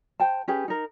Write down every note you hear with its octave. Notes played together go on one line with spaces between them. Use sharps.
C5 G5 A5
C#4 G4 G#4 B4
D#4 A#4